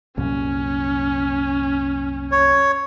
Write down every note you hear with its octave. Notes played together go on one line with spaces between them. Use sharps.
C2 F#2 A#2 C#4
C#5